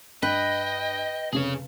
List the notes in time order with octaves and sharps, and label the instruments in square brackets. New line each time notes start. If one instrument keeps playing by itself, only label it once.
[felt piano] G2 [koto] B4 [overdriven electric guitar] D#5 [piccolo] G5
[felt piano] F1 C#3 [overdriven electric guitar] G#4 C#5